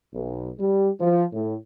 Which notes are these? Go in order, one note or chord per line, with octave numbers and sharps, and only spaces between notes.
B1
G3
F3
A2